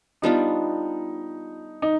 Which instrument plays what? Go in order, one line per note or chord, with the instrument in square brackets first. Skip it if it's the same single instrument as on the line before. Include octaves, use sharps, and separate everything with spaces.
[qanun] G3 B3 D4 F4 [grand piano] D#4
[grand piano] D#4